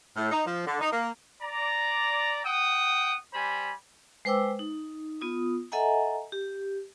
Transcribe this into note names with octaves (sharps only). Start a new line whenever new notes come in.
A2
D#4
F3
D3
D#4
A#3
D5 A#5
F#5 G5 D#6
G3 C5 G#5 B5
G#3 B4 C5 G5 D6 E6
D#4
B3 F4 D#6
A4 D#5 E5 F#5 G#5 A#5
G4